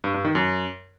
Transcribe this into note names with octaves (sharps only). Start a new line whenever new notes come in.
G2
G2
D#3
F#2